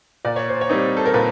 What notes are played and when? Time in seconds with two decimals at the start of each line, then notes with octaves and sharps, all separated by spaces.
0.25 A#2 D5
0.36 C#5
0.49 C5
0.61 C#5
0.69 G3 C4 D#4
0.97 A4
1.06 A#4
1.14 A#2 B4